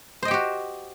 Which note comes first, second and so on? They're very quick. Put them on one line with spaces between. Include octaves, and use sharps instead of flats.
C5 D#5 G5 G4 F#4